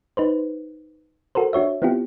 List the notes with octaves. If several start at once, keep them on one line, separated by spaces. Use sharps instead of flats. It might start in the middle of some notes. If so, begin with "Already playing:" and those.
D#4 B4 C5
F#4 A4 A#4 C5
D4 F#4 C#5 E5
B3 C4 E4 F4 G4